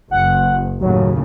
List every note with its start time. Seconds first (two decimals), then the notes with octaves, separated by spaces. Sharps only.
0.11 F#1 F#5
0.81 D#2 A2 C#3 F#3